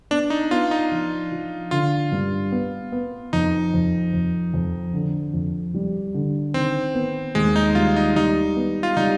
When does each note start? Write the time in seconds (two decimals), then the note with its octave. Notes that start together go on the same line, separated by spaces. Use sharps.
0.11 B3 D4
0.30 D#4
0.51 B3 F4
0.71 D#4
0.91 F3
1.32 F3
1.71 D3 F4
2.12 G2
2.52 B3
2.92 B3
3.33 F2 D#4
3.74 F2
4.13 F2
4.54 F2
4.94 D3
5.34 F2
5.74 G3
6.14 D3
6.54 D#3 C4
6.95 B3
7.35 D#2 G#3
7.56 D#4
7.75 G3 F4
7.96 D#4
8.16 G3 D#4
8.56 B3
8.83 F4
8.97 G3 D#4